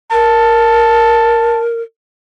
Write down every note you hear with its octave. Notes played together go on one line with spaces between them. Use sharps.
A#4 A5